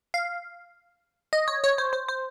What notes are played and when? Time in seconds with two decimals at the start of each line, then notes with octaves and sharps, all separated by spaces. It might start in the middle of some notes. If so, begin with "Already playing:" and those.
0.14 F5
1.33 D#5
1.48 C#5
1.64 C#5
1.78 C5
1.93 C5
2.08 C5